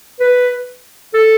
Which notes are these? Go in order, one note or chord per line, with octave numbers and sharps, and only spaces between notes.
B4
A4